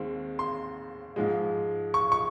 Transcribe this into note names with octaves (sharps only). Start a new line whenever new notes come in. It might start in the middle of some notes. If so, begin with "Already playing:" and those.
Already playing: D#2 D#3 G#3 C4
C6
G#2 F3 G#3
C#6
C#6